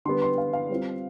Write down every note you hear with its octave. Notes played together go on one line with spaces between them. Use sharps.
D3 G3 B3 C6
C6
F5
F5
G3 C4 F4